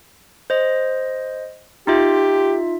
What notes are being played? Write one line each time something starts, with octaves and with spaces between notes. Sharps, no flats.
C5 D#5
D#4 F4 G4 E5